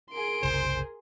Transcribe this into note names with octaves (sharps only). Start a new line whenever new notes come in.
G#4 A#4 C6 D7
F#1 C2 C#3 C5